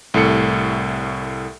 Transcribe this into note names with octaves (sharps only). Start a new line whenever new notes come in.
C2 A2 A4 C#7